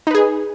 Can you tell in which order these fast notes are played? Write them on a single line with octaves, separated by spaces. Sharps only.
D#4 B4 G#4